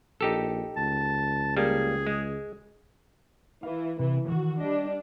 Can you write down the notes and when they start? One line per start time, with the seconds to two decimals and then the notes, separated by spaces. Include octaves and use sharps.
0.21 A#1 D#4 G4 A4
0.77 C#2 A5
1.57 G3 A#3 G#4
2.07 G#3
3.63 E3 F5
3.99 C3 E3
4.28 D#3 E3 F#4
4.60 G3 D4 D#5